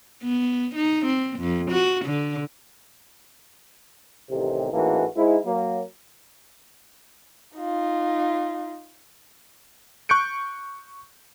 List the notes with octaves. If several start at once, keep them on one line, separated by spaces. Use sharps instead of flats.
B3
D#4
C4
F2
F#4
D3
A1 C3 D#3
A1 G#2 E3 A#3 F#4 A4
G#2 E4
F#3 A#3
D#4 F4
C#6 F#6 G6 C#7 D7